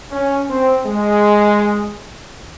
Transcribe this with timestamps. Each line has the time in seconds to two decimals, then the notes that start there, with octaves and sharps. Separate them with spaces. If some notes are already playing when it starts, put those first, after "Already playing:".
0.11 C#4
0.48 C4
0.85 G#3